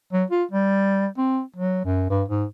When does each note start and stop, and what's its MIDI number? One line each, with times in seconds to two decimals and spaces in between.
0.13 0.24 54
0.30 0.44 65
0.51 1.07 55
1.17 1.41 60
1.56 1.84 54
1.85 2.09 42
2.10 2.23 43
2.28 2.45 44